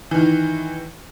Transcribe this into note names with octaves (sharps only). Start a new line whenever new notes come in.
D#3 E3